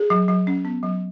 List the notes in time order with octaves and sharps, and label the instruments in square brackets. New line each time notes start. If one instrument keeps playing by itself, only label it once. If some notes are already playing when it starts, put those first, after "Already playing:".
Already playing: [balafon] G#4
F#3
F#3
C#4
B3
F#3